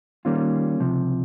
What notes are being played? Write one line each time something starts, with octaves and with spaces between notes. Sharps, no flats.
D#3 G3 A#3 C#4 F4
C#2 C3 F3